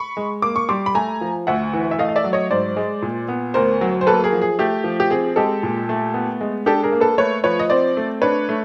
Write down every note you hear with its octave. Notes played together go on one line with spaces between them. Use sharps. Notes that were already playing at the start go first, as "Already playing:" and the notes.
Already playing: B5 C#6
G#3
A#3 D6
C#6
G3 C6 D6
B5
A3 G#5 A#5
F3
D2 E5 F#5
E3
E5
A3 D#5 F5
D#5
D5 E5
F#3
C#5 D#5
G#2 C5 D5
G#3
A#2
B3
D2 A#4 C5
F#3
C5
A#3 A4 B4
G#4 A#4
F3
G#4
A3 G4
F3
G4
C4 G#4
G#3 G4 A4
A#2
A3
B3
G#3
D4 G4 A4
G#4 A#4
A#3
A4 B4
A3 B4 C#5
F3 B4 C#5
D#5
C4 C5 D5
A3
D4 B4 C#5
A3